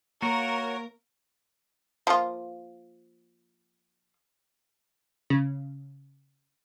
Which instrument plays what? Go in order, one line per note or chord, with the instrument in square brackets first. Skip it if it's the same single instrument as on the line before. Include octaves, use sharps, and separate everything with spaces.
[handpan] A#3 [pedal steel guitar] F#4 [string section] A#4 [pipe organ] C#5
[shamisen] F3 A#3 F4
[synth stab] C#3